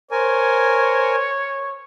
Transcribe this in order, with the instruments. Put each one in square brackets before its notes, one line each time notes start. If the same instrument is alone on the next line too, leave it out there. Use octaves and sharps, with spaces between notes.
[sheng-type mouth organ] A#4 G#5 [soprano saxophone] C5 [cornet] C#5